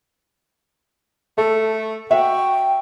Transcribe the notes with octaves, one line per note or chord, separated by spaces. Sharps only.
A3 A4
F#4 E5 G5